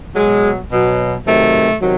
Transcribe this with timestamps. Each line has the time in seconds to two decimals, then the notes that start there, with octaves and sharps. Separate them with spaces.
0.15 B2 F#3 G#3
0.71 B2 F#3
1.25 C3 D#3 F#3 A3
1.81 C3 D#3 F#3